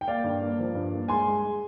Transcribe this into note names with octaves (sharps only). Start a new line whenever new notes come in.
G5
A#3 D5 F5
G2
A#3
F3
G2
A#3
G#3 G#5 C6
G#3
G#3